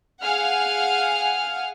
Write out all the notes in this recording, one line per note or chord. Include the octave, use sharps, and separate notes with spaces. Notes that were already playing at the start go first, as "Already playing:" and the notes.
G#4 F5 F#5 G#5 F6